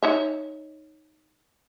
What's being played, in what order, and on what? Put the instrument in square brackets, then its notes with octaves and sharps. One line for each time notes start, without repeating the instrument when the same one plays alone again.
[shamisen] D#4 C#5 E5